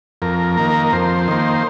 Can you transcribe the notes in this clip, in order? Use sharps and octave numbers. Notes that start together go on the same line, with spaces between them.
F2 A#4
D#3 A#3
F2 C5
D#3 A#3